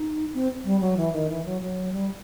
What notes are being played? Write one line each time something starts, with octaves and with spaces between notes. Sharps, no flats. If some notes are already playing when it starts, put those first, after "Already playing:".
Already playing: D#4
C4
G3
F#3
E3
D#3
E3
F#3
F#3
G3